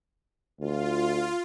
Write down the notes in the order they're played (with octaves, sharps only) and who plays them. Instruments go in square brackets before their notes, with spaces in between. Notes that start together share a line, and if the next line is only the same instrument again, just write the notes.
[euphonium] D2 [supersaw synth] F4